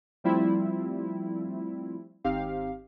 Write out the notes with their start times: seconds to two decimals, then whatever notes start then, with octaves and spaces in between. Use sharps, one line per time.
0.24 F3 G3 A3 C4 E4 F4
2.24 G#1 C4 D#4 G4 F5